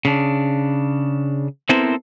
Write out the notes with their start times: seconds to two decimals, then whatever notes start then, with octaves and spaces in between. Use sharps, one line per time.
0.05 C#3 D4
1.69 B3 C4 E4 A4 A#4 C5